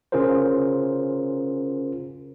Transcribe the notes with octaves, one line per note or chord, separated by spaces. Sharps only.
C#3 C#4 F4 G#4 A#4 C5